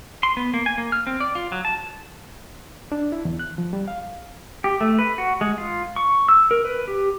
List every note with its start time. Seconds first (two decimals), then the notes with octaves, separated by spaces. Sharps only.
0.23 C6
0.37 B3
0.54 A#3
0.66 G#5
0.78 A#3
0.92 F6
1.07 C4
1.20 D5
1.35 F4
1.52 F#3
1.65 A5
2.92 D4
3.12 E4
3.25 E2
3.39 F#6
3.58 F3
3.73 G3
3.88 F5
4.64 G4
4.81 A3
4.99 B4
5.18 F#4
5.41 G#3
5.58 F4
5.96 C#6
6.29 E6
6.51 A#4
6.65 B4
6.88 G4